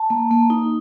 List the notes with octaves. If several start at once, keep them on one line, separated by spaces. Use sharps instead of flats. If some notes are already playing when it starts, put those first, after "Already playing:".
Already playing: A5
A#3
A#3
D#4